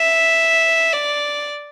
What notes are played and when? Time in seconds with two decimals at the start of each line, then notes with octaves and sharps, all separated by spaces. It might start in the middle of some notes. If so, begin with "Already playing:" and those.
Already playing: E5
0.93 D5